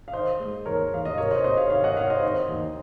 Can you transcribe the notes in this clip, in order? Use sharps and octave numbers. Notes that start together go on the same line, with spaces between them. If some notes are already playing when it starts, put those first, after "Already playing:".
F5
D#3 C5 D#5
G#3
D#2 A#4 C#5
D#2 F5
D#5
C3 A#4 C#5
C5 D#5
C3 C5 D#5
C#5 F5
D#3 C#5 F5
D#5 F#5
C3 C#5 F5
C5 D#5
D#3 C5 D#5
D#2